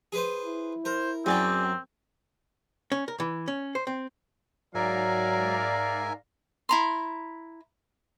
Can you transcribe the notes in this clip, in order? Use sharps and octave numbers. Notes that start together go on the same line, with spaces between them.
G#4 B4 C5
E4
A#4 C5
F#2 F#3 C4 G#4 D5 G5
C#4
A#4
E3
C#4
C5
C4
G#2 F#3 A#4 D5 E5 F5 G#5 A#5
E4 A#5 C6